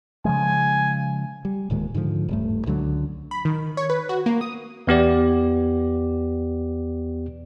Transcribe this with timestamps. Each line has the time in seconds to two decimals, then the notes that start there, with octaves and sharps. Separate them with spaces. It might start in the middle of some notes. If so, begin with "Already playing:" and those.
0.25 C#3 F3 G#3 G#5
1.45 G3
1.70 D1 A#2 D#3 G#3
1.94 G#2 D3 E3 F3
2.29 D#1 G2 A3
2.66 C#2 D3 E3 F#3
3.31 B5
3.45 D#3
3.77 C#5
3.90 B4
4.09 F#4
4.26 A#3
4.41 D#6
4.87 E2 B3 G4 D5